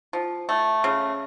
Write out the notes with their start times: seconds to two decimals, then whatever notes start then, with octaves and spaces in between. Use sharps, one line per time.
0.13 F3
0.49 A3
0.84 C#3